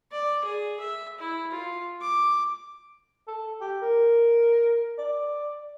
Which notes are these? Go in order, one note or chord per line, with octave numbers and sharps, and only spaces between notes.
D5
G#4
E5
E4
F4
D6
A4
G4
A#4
D5